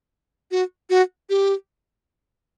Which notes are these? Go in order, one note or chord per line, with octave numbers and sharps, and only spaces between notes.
F#4
F#4
G4